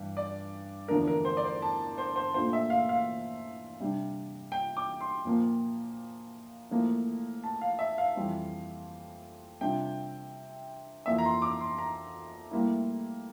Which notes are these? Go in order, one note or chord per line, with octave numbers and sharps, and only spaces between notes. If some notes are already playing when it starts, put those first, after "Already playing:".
Already playing: G2 E3
D5
E2 D3 F3 A3 D4 A#4
A#4
C5
D5
C5
A5
C5
C5
A#2 A3 D4 F4 C5
E5
F5
F5
C3 G3 D4
G5
D6
C6
A#2 F3 A#3
A2 F3 A#3
A5
F5
E5
F5
F2 E3 G3 C4
C3 G3 D4 F4 G5
F2 E3 A#3 E5
A#5
C6
D6
C6
A#5
A2 G3 A#3 E4